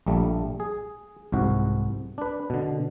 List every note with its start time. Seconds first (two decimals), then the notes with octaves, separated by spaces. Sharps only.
0.06 A#1 G3 A3
0.60 G#4
1.32 C2 G#2 F#4
2.18 D4 B4
2.50 B2 D3